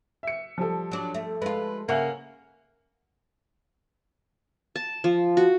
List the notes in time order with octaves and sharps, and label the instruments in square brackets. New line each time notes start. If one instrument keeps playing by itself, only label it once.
[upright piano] E5 C#7
F3 G3 A4
[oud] F#3 D4
A3
[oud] G#3 F4 [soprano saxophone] B4
[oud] C#3 [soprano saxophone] A#3 [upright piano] E5 F#5 G#5
[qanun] A5
F3
F#4